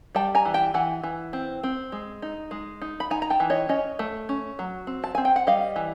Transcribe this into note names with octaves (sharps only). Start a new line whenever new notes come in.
G3 G5 A5
G#5 A#5
E3
G5 A5
E3 F#5 G#5
E3
C4
C4
G#3
D#4
G#3
D#4
B5
D#4 G#5 A#5
A#5
G5 A5
E3
C#5 D#5
C#4 C#5 D#5
A3
C#4
F#3
C4
A5
C4 G#5
G5
F#5
G3 D#5 F5
E3